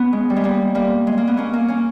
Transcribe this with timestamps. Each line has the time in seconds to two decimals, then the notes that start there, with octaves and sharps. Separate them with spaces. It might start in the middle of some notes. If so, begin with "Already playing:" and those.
Already playing: B3 C#4
0.13 G#3
0.30 G3
0.36 G#3
0.44 G3 A#3
0.75 G3 A#3
1.07 G#3
1.18 A#3
1.27 B3
1.37 A#3 C#4
1.53 A#3 C#4
1.68 A#3 C#4